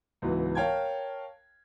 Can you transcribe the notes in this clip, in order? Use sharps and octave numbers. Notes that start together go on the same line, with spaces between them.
C#2 G#2 E3 F#3 B3
A#4 C#5 F5 G5 A5 G#6